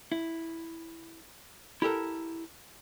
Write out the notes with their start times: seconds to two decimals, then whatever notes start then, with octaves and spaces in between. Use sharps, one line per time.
0.12 E4
1.82 E4 G4 A4 A#4